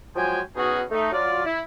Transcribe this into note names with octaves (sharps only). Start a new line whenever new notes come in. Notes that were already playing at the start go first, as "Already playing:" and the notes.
F3 F#3 G#3 G5 G#5
B2 B3 C#4 D#4 F#4 G#4
A3 D#4
F#3 F4 D5
E4